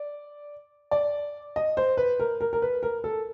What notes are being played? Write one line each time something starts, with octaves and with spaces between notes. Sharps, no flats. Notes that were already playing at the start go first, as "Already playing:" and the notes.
Already playing: D5
D5
D#5
C5
B4
A#4
A#4
A#4
B4
A#4
A4